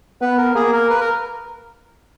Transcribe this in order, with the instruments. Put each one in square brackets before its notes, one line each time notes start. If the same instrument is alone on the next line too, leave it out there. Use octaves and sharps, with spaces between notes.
[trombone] B3 [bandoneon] B4
[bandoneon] A#4
[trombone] A#3 [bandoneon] G#4
[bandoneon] A#4
B4
A#4